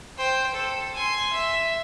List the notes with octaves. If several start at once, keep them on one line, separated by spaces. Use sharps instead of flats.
C5 G5
A4
G#5 C6
E5